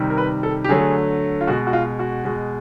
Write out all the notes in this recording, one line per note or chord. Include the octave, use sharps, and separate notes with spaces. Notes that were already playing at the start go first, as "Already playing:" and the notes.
Already playing: C3 D#3 G3
A#4
B4
A4
G4
D3 F#3 A3 G#4
F4
B2 G#3 F#4
F#4
F4
F#4
B2 G#3